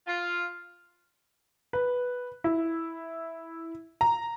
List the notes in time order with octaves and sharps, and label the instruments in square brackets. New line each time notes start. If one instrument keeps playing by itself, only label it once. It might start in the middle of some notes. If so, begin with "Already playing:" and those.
[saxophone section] F4
[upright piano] B4
E4
A#5